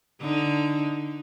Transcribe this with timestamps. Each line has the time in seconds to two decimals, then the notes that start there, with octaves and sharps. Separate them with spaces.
0.22 D3 D#4